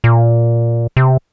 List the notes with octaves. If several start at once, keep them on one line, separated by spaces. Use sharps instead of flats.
A#2
C3